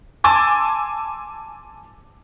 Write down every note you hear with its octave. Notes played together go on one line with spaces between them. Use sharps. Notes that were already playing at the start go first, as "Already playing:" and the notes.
G#5 A5 C6 D6 E6 A6